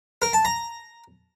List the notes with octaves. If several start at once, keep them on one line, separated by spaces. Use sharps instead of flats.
A#4
A5
A#5